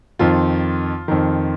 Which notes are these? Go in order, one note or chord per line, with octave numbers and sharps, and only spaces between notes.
F2 D#3 F4
F2 D#3